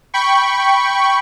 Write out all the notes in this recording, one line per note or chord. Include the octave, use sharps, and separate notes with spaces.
G5 B5 C#6